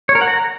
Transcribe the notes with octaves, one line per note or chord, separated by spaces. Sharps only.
C#5
A#4
F#5
A#5